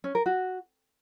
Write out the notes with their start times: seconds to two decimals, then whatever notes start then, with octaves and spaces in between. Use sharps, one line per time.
0.04 C#4
0.15 A#4
0.26 F#4